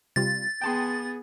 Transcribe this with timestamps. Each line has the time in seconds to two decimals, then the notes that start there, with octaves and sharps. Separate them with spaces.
0.16 C3 G3 F4 A6
0.61 B3 G#4 G5 A5 C6